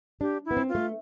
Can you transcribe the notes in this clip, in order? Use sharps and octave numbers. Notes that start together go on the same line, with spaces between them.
D4 G4
E4
B3
C4
F4
A3